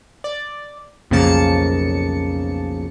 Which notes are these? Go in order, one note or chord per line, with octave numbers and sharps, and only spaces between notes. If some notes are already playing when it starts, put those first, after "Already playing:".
D5
B1 F2 C#3 A#3 A5 C#7